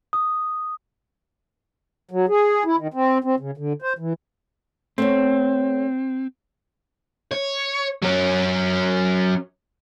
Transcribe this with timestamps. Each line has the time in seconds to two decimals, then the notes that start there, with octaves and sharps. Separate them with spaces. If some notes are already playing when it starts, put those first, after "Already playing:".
0.13 D#6
2.11 F#3
2.29 G#4
2.65 E4
2.77 D#3
2.94 C4
3.24 C4
3.40 C#3
3.58 D3
3.82 C5
3.99 E3
4.98 A3 B3 C4 C#5
7.31 C#5
8.02 F#3 C#4